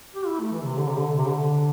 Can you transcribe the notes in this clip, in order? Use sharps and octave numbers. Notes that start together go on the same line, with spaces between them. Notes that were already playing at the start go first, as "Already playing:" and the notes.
G4
E4
A3
E3
C3
D3
C3
D3
C3
D3